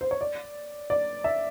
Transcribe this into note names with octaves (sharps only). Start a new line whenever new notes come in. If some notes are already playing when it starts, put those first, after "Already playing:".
C5
C#5
D5
D5
E5